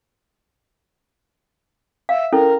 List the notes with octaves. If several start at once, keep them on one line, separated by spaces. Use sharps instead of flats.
E5 F5
C#4 E4 A4 A#4